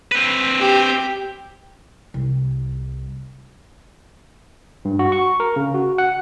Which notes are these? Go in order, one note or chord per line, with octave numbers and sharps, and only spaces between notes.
C4 B4
G4
C2
G2
F#4
C#6
A#4
C#3
F#4
F#5